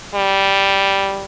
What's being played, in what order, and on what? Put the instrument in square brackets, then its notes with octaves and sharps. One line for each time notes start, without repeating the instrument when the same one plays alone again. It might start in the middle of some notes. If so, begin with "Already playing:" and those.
[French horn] G3